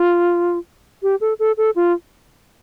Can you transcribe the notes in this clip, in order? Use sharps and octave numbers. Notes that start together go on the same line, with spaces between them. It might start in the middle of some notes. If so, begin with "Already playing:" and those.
Already playing: F4
G4
A4
A4
A4
F4